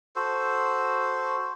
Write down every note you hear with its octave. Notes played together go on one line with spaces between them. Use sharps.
F#4 A4 C5